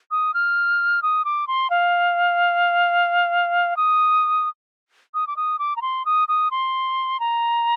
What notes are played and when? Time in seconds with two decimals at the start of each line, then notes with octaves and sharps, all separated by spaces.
0.11 D#6
0.34 F6
1.02 D#6
1.25 D6
1.48 C6
1.70 F5
3.77 D#6
5.14 D#6
5.27 D6
5.36 D#6
5.59 D6
5.76 A#5
5.82 C6
6.05 D#6
6.28 D#6
6.51 C6
7.20 A#5